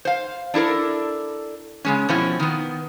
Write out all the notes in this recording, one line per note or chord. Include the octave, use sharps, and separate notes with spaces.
C5 F5
D4 E4 A4 A#4
C#3 G#3 C#4
B2 F3 C4 C#4 E4
D#3 B3